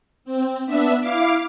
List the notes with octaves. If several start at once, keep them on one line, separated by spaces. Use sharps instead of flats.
C4
B3 D4 E5
E4 F5 D6